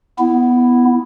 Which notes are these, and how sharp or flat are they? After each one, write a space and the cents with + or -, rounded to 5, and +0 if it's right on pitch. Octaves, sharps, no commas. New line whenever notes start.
B3 +0 E4 +0